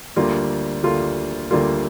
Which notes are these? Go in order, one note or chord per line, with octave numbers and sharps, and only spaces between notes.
D2 D3 G3 A#3 F4
D2 D3 G3 A#3 F4
D2 D3 G3 A#3 F4